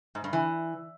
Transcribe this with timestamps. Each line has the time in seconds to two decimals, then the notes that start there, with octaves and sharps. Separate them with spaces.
0.15 G#2
0.24 G2
0.33 E3